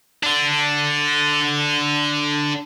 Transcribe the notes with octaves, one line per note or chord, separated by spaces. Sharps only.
D3 D4